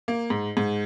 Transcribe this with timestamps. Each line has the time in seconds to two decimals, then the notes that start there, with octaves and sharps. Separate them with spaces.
0.08 A#3
0.30 G#2
0.57 G#2